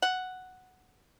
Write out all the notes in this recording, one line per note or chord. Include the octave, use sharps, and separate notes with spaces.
F#5